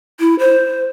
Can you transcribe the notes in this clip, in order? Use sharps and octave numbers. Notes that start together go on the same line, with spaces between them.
E4
C5